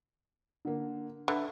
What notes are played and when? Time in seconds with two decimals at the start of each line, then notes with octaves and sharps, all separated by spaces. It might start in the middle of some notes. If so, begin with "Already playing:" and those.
0.65 D3 A#3
1.28 D3 B4 E5 B5